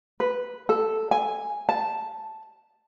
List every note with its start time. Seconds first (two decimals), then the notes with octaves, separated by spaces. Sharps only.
0.20 B4
0.69 A4
1.11 G#5
1.69 A5